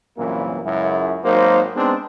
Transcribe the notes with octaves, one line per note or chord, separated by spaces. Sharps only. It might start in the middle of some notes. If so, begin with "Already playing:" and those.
C2 F#2 A#2 E3 A#3 A#4
C#2 F#2 E4
G#1 F#3 A#3 D#4 C5
G#3 B3 C4 D4 D#4